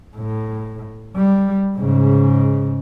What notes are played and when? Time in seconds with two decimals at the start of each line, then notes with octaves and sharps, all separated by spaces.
0.17 A2
1.16 G3
1.77 G#2 C#3